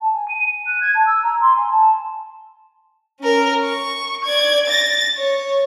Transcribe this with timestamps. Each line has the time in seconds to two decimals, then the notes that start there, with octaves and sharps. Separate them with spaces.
0.01 A5
0.13 G#5
0.29 D#7
0.44 D#7
0.66 F#6
0.81 G#6
0.95 A5
1.06 E6
1.23 A#5
1.41 C6
1.56 G#5
1.71 A5
3.20 C#4 A#4
3.65 C#6
4.25 D5 G#6
4.67 A6 A#6
5.17 C#5